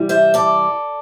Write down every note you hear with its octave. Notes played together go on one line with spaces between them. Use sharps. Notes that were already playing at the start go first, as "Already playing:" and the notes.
Already playing: C3 E3 G3
C5 E5
A4 D5